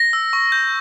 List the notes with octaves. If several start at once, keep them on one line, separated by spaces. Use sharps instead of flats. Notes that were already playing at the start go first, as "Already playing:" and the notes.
Already playing: A#6
E6
C#6
G6